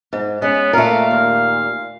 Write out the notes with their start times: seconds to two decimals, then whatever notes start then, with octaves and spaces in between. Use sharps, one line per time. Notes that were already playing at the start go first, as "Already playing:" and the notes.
0.13 G#2
0.42 G#3 B3 C#4
0.73 A#2 A3 A#4 F5
1.11 D#2